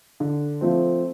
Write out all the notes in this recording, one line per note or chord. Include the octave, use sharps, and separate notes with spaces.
D3
F3 A3 C4